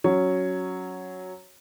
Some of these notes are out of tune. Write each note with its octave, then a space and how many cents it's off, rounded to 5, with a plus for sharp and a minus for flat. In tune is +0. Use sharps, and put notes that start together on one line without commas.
F#3 +0 C#4 +0 C#5 +0